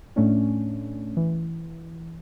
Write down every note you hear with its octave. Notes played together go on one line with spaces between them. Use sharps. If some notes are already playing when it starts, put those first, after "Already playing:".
A2 A3 C#4 D4
E3